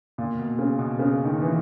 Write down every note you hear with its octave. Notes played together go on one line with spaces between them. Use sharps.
A#2
B2
C#3
B2
C#3
D#3
E3